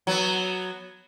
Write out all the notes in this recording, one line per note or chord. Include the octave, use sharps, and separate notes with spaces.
F#3 B3